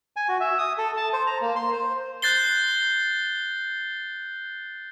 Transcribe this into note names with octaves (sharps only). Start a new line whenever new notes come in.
G#5
F#4
E5
D#6
A4
A5
C5
A#5
A#3
C6
C5
F#6 G6 A6 C7 G7